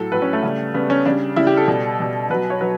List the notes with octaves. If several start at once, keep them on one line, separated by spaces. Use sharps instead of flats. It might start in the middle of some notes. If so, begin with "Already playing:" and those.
Already playing: A2 F#3 A4
A2 F#3 B4
C#4
A3
C#3 G3
C#3 G3 B3
C#4
C#3 G3 D4
C#3 G3 E4
G4
A4
B2 G3
B2 G3
B2 F#3 B4
C#5
F#3 B4